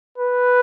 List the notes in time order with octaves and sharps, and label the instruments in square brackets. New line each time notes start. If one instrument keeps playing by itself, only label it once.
[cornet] B4